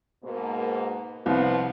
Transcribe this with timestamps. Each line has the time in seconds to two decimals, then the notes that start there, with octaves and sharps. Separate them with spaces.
0.24 G#2 B2 A#3
1.26 C2 F3 B3